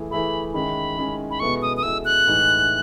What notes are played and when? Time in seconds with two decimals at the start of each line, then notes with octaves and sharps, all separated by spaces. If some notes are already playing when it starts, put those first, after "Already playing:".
Already playing: E3 A3 E4 G#4
0.11 E3 A3 E4 G#4 B5
0.54 D#3 G#3 C#4 E4 B5
0.97 D#3 G#3 C#4 E4
1.31 B5
1.40 B2 G#3 B3 E4 A4 C#6
1.62 D#6
1.77 D#6
1.83 B2 G#3 B3 E4 A4 E6
2.05 F#6
2.26 A2 E3 G#3 D#4